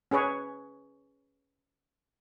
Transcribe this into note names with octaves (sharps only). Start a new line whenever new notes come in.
C#4 G#4 B4 C#5